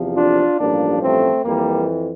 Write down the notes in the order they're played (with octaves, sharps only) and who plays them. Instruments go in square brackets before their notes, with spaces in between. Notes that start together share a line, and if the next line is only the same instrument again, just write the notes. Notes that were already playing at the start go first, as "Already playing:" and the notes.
Already playing: [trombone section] E2 C3 F3
D4 F4
A1 G2 F3 A#3 D4
A3 C4
F2 E3 G3 A#3